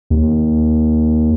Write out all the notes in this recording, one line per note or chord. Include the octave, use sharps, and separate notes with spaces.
D#2